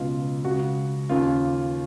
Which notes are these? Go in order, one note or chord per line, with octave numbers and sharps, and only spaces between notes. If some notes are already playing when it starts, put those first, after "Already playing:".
Already playing: C#2 B2 F4
C#2 C#3 F#4
D#2 C#3 F4